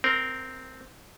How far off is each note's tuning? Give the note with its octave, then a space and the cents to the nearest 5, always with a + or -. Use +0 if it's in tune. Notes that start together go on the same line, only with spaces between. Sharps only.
C4 -5 A#4 +0